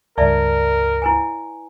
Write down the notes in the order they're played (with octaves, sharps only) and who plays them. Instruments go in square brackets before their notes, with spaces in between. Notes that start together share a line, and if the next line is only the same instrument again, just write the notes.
[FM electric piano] C#2 G2 [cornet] A#4 [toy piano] D5 E5 A5
[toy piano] E4 B4 G#5